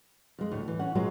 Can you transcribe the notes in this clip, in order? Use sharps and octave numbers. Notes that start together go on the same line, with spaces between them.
F2 G#3
D2 A2 C#5
E3
C#4 F#5
A#2 F#3 G#3 C#4 F4